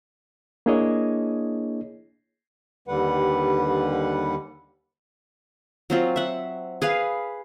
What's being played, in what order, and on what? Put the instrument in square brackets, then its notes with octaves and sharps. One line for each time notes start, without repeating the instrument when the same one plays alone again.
[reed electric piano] A#3 D4 E4 G#4 C#5 D#5
[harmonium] D#2 D3 G3 B4 F#5
[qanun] F#3 C4 F4
E5 F#5
G#4 B4 F5